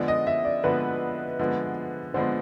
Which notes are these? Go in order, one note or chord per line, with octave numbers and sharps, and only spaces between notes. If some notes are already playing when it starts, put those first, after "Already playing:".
Already playing: D3 F3 G#3 B3 D5
D#5
E5
D5
D3 F3 G#3 B3 B4
D3 F3 G#3 B3
D3 F3 G#3 B3 C5